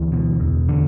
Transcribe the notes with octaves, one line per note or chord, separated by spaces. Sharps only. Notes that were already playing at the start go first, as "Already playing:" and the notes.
Already playing: D2 E3
B2
E2
D3